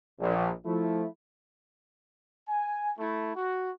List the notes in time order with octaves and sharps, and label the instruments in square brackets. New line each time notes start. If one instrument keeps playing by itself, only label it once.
[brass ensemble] A#1
F3 A3 E4
[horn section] G#5
A3 E4
F#4